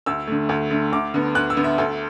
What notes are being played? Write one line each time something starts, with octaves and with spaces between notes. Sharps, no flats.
D2 E6
D3 A3
D2
D3 A3
D2 D6
D3 B3
D2 F#6
E6
D3 B3
E5
D2 A4